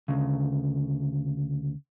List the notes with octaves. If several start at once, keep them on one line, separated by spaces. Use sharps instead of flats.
D2 C#3